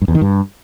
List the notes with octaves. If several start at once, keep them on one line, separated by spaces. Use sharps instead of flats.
G2
E2
D#3
G2